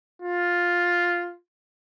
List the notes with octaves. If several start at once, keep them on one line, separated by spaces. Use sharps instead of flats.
F4